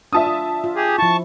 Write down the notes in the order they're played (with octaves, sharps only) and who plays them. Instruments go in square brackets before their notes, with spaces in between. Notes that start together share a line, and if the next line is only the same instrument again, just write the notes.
[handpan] D4 F4 [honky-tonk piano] E5 A5 D#6
[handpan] F4
F4
[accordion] G4 G#4
[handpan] F3 E4 [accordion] A5 C#6